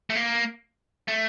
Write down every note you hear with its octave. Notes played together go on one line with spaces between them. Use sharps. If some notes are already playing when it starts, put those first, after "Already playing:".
A3
A#3
A3